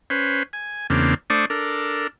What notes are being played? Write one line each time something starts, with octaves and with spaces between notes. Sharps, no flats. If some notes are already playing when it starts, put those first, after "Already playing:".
C#4 B4 C5
G#5
E2 C#3 A#3 C4 D4
A3 D4 C5 D5 C#6 D#6
D4 A4 A#4